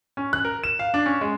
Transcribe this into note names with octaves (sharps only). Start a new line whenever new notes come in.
C#4
F#6
A#4
E7
F5
D4
C#4
G#3